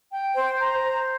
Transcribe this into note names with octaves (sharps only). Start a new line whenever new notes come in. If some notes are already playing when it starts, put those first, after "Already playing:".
G5
C5
A#5
C5